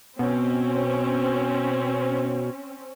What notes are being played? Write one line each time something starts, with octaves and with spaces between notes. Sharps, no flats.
B2 C4 C#4